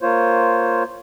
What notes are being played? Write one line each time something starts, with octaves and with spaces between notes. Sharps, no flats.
A#3 F4 C5 C#5